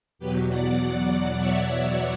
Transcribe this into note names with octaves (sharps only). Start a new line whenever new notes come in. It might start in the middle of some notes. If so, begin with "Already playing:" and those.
E2 B2 F#3 G4 B4
D5 F#5
D5 F#5
D5 F#5
C#5 E5
D5 F#5